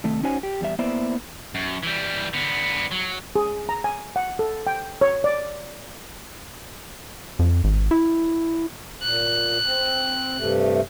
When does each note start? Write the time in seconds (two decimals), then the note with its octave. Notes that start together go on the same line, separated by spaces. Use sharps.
0.04 C3 D#3 A3
0.23 C#4 D#4 F#4 C5 C#5 G#5
0.43 G4
0.61 E2 G3 E5
0.79 A#3 B3 E4 C5 D5 E5
1.55 F#2
1.83 E3 G3
2.34 D3 B3
2.91 F#3
3.36 G#4
3.69 A#5
3.84 G#5
4.16 F#5
4.39 A4
4.67 G5
5.01 C#5
5.24 D5
7.39 F2
7.64 G#1
7.91 E4
9.02 A#2 F#6
9.65 C4
10.37 G2 C3 A3